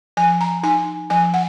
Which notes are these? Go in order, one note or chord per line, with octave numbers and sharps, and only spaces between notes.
F3 G#5
A#5
D#4 G#5
F3 G#5
F#5